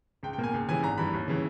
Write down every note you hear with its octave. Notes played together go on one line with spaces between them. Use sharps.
C#2 G5
G5
B2 A#3
G#5
C#2
C#3 E3 G3 G#5
G#1 A#5
G2 E3 B5
D#2
C#3 E3